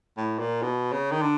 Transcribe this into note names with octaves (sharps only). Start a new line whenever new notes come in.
A2
A#2
B2
C#3
D#3
D3